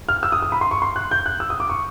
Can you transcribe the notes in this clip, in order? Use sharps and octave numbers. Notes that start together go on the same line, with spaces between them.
F6
E6
D#6
D#6
B5
C6
C#6
C6
F#6
G6
F#6
E6
D#6
D6
C#6